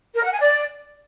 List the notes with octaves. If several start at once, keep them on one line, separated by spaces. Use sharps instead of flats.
A#4
F#5
G#5
D5